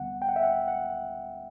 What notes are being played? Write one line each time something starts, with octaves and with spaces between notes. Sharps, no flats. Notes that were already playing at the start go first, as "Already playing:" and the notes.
Already playing: D2 D3 G3 B3 F#5
G5
F#5
E5
F#5
F#5